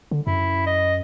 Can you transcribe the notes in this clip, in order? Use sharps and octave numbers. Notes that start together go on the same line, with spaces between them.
D3
F#2 E4
D#5